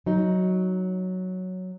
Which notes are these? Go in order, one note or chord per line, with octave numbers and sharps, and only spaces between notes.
F#3 D#4